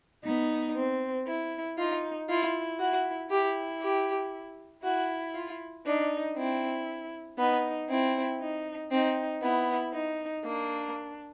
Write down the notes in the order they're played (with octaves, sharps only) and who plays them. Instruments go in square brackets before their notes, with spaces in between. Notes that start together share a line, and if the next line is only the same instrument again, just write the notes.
[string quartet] B3 [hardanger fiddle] D#4
[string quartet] C4
E4
[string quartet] D#4 [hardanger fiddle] F4
[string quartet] E4 [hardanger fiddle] F4
[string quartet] E4 [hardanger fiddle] F#4
[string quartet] E4 [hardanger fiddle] G4
[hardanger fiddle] G4
[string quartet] E4 [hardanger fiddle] F#4
[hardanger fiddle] F4
[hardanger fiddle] D4 [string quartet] D#4
[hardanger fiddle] C4 [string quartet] E4
[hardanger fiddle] B3 [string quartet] D#4
[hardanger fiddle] C4 [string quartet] E4
[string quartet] D#4
[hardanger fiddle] C4 [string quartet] D#4
[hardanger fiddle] B3 [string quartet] E4
[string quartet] D#4
[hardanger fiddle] A#3 [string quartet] D4